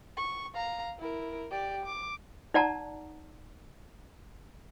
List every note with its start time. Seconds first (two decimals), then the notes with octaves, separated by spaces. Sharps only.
0.17 C#6
0.54 F5 A#5
0.99 E4 A#4
1.51 G4 D5
1.85 D6
2.54 D#4 D5 F#5 A5 A#5